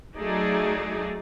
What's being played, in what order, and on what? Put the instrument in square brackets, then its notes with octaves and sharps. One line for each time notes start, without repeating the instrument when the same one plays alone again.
[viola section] F#3 A3 D#4 G#4 D5